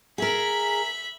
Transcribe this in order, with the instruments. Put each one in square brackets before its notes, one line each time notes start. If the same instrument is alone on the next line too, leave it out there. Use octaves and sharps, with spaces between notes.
[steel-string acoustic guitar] G#4 A#4 [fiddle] E5 B5